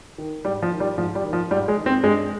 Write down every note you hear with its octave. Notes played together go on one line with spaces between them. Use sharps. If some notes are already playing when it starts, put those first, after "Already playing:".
D#3
G#2 G3
F3
D#3
G3
G#2 F3
G3
D#3
F3
G#2 G3
G#3
D#3
C4
G2 G#3